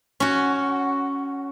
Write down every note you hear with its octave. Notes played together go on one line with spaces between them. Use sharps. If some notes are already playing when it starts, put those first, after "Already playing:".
C#4 F#4